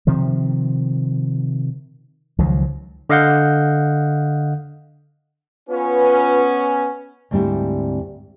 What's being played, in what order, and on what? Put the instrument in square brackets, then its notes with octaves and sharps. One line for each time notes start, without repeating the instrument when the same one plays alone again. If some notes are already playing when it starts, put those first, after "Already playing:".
[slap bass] C3 D#3 F3
C#2 D#3 F3 F#3
[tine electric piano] D3 D#5 F5 F#5 G6
[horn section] B3 C#4 [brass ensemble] F4 B4
[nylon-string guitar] D2 G#2 G3 C4 E4 E5